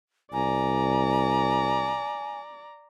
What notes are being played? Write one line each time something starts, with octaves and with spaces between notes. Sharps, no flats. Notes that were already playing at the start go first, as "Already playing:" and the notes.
C2 D5 G#5 A#5